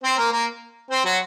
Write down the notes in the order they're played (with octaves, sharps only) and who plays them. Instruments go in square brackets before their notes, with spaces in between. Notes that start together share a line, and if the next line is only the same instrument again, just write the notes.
[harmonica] C4 C5
A#3 A#4
A#3 A#4
C4 C5
F#3 F#4